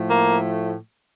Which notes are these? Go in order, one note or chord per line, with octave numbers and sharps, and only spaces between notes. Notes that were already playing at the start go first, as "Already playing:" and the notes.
Already playing: A2 F3 A3
A#3